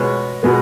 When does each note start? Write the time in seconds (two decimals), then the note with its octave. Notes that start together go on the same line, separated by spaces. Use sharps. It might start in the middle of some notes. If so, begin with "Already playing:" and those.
Already playing: B2 G#3 B3 C#5
0.43 B2 G#3 B3